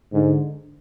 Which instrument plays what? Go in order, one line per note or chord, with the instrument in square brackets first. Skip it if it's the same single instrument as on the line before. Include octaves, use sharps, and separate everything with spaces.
[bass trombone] G#2 [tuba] D3